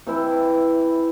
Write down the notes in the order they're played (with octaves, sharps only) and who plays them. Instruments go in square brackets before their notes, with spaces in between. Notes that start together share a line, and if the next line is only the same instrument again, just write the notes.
[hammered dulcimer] C3 E3 E4